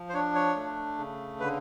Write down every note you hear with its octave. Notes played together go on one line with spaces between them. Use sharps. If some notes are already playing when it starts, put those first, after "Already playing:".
Already playing: F3
C5
D4 C#5
C#5
A3
C#3
D3 B4